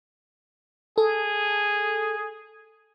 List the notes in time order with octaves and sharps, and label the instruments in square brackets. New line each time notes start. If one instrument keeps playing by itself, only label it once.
[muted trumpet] G#4 [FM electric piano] A4